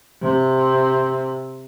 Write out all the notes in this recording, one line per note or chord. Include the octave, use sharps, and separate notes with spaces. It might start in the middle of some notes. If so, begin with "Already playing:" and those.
C3 C4